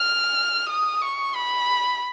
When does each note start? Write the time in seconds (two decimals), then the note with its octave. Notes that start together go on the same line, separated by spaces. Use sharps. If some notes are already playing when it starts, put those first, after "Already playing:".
Already playing: F6
0.69 D#6
1.02 C#6
1.35 B5